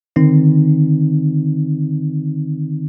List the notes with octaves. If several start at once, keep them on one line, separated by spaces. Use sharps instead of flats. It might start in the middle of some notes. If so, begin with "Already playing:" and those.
D3 D#3 C4 D#4